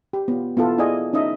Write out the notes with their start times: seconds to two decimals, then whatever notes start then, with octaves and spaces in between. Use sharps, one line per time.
0.13 G4
0.28 B3 F4
0.57 B3 E4 F4 A4
0.78 E4 G#4 D5 D#5 G#5
1.13 C#4 D#4 D#5 E5